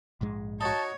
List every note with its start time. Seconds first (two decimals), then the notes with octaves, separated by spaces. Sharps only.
0.21 A#1 G#2 G#3
0.61 D#4 F#4 C#5 A5